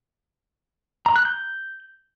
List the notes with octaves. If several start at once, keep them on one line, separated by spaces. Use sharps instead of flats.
A#5
F#6
G6